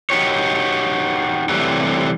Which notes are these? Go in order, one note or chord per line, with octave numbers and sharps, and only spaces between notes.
D#4 F#4 G4 C#5
C3 E3 F#3 G3 A3